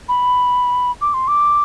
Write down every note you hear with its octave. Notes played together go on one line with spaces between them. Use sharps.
B5
D6
C6
D6